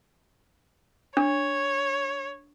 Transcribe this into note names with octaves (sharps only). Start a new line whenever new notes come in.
D4 C#5